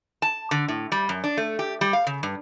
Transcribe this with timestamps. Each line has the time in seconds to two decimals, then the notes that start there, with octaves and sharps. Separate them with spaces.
0.22 A5
0.51 D3
0.68 A2
0.92 G3
1.09 F#2
1.24 D4
1.37 A3
1.59 G4
1.81 G3
1.93 F5
2.07 C#3
2.23 G2